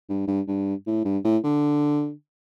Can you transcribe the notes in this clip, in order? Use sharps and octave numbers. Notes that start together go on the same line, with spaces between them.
G2
G2
G2
A2
G2
A2
D3